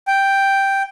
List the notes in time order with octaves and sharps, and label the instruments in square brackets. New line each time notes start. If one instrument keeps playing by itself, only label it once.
[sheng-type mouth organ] G5